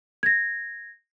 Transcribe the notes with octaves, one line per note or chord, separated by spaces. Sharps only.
G#6 A#6